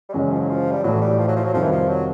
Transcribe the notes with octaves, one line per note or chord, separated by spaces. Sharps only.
G3
F#2 C#3 E3 F#3 G#3 C#4
F3
F#3
F3
G3
A2 E3 F#3 A3
G3
F3
F#3
F3
F#3
F2 C3 D#3 F3 G3
E3
F3
F#3